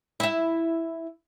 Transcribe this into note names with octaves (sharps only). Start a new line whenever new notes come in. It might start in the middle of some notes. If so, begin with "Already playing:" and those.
E4 E5